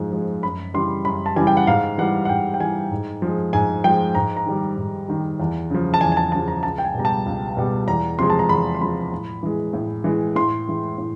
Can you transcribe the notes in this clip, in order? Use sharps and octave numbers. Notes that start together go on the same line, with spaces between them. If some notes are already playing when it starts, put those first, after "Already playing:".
Already playing: G#2 F3 G#3
F3 G#3
F#2 B5
C#3 E3 G3 C6
F#2 B5
A5
C#3 E3 G3 G#5
G5
F#5
G#2 F5
E3 G3 F#5
F#5
G#2 G5
G5
E3 G3 G#5
G#2
F3 G#3
G#2 G#5
F3 G#3 G5
G#2 A#5
A#5
D#3 G3
G#2
D#3 G3
E2
C#3 F3
A5
E2 G#5
G#5
A5
C#3 F3 A5
A#5
C#2 A5
G5
G#5
B2 G3 A#5
A5
C#2
B2 G3
E2 A#5
C3 F3 G#3 C6
A5
A#5
E2 B5
C6
C3 F3 G#3 B5
A2
E3 G#3
A2
E3 G#3
A2 C6
E3 G#3
A2